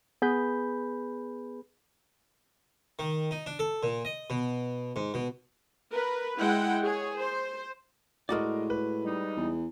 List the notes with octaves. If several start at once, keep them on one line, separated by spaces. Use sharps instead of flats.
B3 G#4 B4 B5 G6
D#3
D#4
D4
A4
A#2
D#5
B2
G#2
B2
A#4 B4
G#3 E4 F#5 G5
G#4 C#5
C5
A2 G#3 F#4 A#4 D5 D#5
B4
G3 D#4
E2